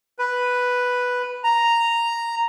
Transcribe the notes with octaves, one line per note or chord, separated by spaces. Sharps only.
B4
A#5